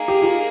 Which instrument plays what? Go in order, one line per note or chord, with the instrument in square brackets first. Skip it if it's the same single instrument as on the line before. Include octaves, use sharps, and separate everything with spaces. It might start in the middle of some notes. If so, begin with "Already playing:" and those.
Already playing: [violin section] A#3 D#4 G#4
[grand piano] G4
F4